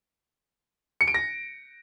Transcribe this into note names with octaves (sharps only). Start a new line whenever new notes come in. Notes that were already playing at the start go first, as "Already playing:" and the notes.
C#7
D7
A#6